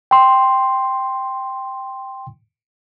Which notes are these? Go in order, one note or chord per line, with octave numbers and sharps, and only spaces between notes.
G5 C6